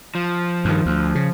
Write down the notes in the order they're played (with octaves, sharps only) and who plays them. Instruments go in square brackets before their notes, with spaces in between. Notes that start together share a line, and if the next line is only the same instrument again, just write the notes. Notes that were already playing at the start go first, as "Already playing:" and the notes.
[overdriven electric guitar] F3
[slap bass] G2 D#3
D2
C#3